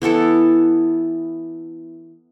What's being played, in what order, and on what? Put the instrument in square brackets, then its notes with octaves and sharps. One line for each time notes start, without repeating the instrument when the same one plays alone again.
[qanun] E3 B3 E4 A4